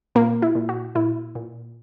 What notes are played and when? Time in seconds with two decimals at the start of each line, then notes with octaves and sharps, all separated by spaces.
0.15 A#2 A#3
0.42 E4
0.55 A#2
0.69 F#4
0.95 A#2 E4
1.35 A#2